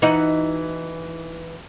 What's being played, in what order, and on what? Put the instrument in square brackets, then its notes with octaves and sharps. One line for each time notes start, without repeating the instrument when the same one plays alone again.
[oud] E3 D#4 F#4